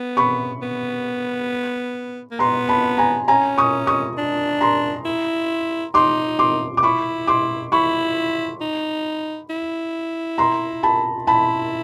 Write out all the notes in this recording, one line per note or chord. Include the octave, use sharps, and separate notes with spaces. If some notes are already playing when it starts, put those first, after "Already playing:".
Already playing: B3
B5 C#6
B3
A#3
B3 A#5 C6
A5 B5
G#5 A#5
C#4 G#5 A#5
C#6 D#6
C#6 D#6
D4
A#5 C6
E4
D#4 C6 D6
C6 D6
D6
E4 B5 C#6
C6 D6
E4 B5 C#6
D#4
E4
A#5 C6
A5 B5
E4 A5 B5